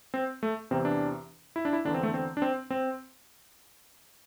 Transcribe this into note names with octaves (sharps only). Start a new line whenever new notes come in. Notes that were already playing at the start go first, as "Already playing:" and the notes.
C4
A3
E2 C3 E3 C4
D4
E4
D4
E4
E2 D3 D4
C4
A3
C4
D4
C4
C4